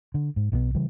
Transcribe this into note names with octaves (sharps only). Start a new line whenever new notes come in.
D3
G#2
B1 B2 D#3 B3
C#3 E3 G3